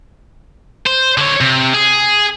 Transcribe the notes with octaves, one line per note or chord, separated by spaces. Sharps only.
C5
D3 C#5
C3
G#4